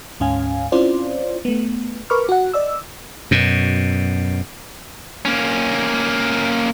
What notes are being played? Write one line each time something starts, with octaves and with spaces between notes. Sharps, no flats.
D2 G#2 C#4 F5 G#5
C4 C#4 E4 F4 C5 D5
A3 B3
A#4 B4 B5 C#6 D6 F6
F#4 F#5
D5 D#5 E6
F#2 B2
A#3 C#4